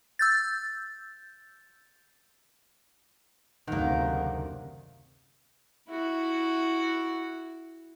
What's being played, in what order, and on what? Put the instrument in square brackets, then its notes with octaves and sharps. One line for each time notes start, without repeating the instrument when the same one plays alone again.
[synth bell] E6 G6 A6
[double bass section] F#1 D2 C3 [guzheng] D#3 A#3 [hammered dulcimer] F#5
[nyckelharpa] E4 F#4